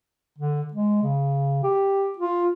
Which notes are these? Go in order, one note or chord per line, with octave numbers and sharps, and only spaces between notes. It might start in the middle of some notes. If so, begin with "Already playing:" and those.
D3
G#3
C#3
G4
F4